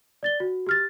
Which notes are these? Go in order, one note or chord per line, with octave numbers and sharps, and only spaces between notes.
D5 A6 G7
F#4
G4 F6 A6